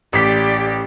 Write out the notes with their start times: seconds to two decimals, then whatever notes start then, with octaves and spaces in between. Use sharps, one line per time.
0.13 A1 G4 D5 B6